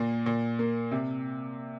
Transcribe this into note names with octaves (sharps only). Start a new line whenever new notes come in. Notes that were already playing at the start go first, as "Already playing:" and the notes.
Already playing: A#2 A#3
A#2
A#3
C3